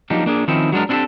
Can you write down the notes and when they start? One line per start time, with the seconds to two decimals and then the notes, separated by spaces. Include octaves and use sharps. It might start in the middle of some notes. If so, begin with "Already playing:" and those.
0.10 F3 F#3 A#3 D4 D#4 G4
0.26 A#3 D4 G#4
0.48 D#3 F3 C4 C#4 D#4 E4
0.72 F#3 G#3 D4 A#4
0.89 C4 D4 E4 F#4 G4 A4